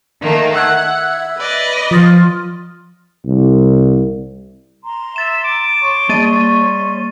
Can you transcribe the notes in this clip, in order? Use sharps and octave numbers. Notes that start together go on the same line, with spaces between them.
D#3 A3 A#3
E5 F#5 E6 F#6 G#6
B4 D5 D#5
F3 F4 D#6 A6
C2
A#5 C6
E5 A6 E7
D6
C#5 C6 C#6
G3 A#3 A6 D#7